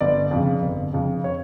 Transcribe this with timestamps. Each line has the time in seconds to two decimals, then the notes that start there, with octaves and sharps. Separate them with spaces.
0.01 G1 D5
0.31 F2
0.36 C#3
0.62 G1
0.93 F2 C#3
1.24 C#5